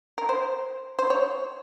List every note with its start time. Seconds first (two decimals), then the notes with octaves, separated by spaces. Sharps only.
0.18 A#4
0.29 C5
0.99 C5
1.10 C#5